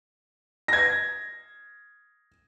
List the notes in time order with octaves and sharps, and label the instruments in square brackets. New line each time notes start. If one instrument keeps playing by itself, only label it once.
[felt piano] G#6 A#6